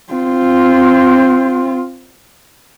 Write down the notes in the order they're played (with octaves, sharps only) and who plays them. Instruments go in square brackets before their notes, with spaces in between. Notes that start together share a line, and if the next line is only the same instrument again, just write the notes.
[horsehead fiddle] C4 F4